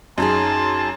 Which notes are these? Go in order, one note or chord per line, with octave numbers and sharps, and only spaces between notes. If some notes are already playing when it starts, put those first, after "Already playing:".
F#2 C#4 D#4 G#4 G#5 A5 C6